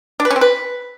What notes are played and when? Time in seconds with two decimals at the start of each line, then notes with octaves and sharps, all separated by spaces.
0.20 D4
0.25 B4
0.30 C#4
0.36 C4
0.41 B4